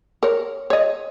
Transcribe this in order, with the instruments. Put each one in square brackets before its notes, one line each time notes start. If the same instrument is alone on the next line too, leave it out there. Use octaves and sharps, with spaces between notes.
[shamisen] A#4 C#5
C#5 D#5